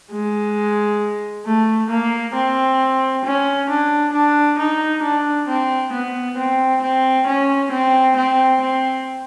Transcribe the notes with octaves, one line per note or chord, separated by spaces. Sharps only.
G#3
A3
A#3
C4
C#4
D4
D4
D#4
D4
C4
B3
C4
C4
C#4
C4
C4
C4